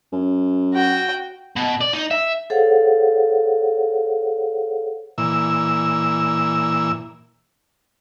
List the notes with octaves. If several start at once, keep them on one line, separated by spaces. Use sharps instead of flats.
F#2
F#4 G5
B2
D5
D#4
E5
G#4 A4 C5 C#5 F5 F#5
A#2 E3 E6